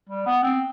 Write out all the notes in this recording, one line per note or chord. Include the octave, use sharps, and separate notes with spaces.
G3
B3
C4